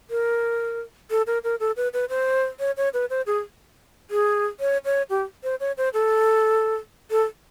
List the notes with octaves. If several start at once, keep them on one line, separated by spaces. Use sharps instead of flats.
A#4
A4
A#4
A#4
A4
B4
B4
C5
C#5
C#5
B4
C5
G#4
G#4
C#5
C#5
G4
C5
C#5
C5
A4
A4